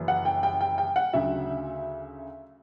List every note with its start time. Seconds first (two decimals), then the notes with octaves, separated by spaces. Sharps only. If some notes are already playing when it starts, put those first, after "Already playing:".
Already playing: F#1 F#2 E3
0.08 F#5
0.25 G5
0.43 G5
0.61 G5
0.78 G5
0.96 F#5
1.13 D2 C#3 F#3 E5